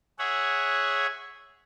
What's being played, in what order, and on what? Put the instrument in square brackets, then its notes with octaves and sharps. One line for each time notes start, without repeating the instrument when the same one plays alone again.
[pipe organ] G#4 C#5 E5 F#5